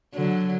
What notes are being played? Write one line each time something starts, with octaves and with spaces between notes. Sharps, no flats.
D3 F#3